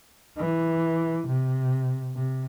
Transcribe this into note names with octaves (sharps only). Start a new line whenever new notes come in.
E3
C3
C3